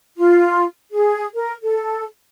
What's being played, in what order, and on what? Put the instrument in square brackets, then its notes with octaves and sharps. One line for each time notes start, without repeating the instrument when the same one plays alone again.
[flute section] F4
G#4
A#4
A4